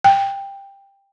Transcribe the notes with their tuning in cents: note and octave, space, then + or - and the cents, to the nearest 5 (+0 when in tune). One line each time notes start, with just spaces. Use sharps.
G5 +15